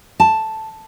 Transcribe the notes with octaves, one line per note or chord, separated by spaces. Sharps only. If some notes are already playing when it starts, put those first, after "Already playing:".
A5